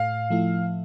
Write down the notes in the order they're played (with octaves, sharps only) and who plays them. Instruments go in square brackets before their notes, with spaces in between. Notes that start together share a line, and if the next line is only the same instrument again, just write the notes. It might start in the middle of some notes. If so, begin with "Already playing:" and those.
Already playing: [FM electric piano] A2 [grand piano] F5
[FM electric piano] F3 A3 E4